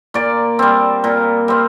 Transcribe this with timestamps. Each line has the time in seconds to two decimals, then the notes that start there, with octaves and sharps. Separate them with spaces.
0.14 A#2 D5
0.59 G3 C4
1.04 A#2
1.48 G3 C4